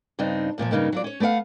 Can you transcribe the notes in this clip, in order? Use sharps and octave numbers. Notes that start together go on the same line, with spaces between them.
G2 C#3 C4 D4 D#4
F#2 A#2 D#3 F3
G2 A#2 C#3 A#3 D#4
F#3 F4 D5
C#4 C#5
A3 B3 D5 F5 F#5